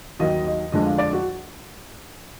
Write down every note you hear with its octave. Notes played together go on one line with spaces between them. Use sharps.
D#2 D#3 F#3 D#5
D#5
F2 D3 G#3 D4 D#5
F5
D5
F#4